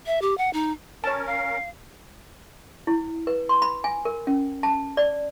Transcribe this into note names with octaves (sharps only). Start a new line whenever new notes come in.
E5
G4
F#5
D#4
C#4 A#4 C#5 A5
F5
E4
B4
C6
B5
G#5
A#4
C#4
A5
D5